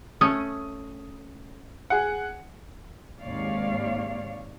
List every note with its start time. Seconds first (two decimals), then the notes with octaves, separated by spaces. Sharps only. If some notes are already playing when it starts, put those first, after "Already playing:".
0.21 A3 C#4 D#6
1.90 G#4 F#5
3.21 D#2 G#2 C3 C#5 D5 F5